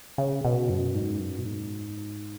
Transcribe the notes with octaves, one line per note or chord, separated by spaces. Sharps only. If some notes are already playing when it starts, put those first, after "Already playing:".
C#3
B2
F#2
G#2
F#2
B2
G#2